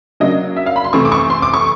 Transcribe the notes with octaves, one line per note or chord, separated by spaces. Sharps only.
C#3 F#3 A#3 D4 D#5
E5
F5
B5
C6
C3 E3 A3 C4 C#6
D6
C#6
C6
D6
C#6